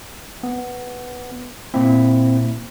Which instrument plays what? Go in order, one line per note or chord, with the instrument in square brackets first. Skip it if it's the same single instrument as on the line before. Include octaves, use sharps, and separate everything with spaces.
[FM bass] B3
[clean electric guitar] A#2 E4 [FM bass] C4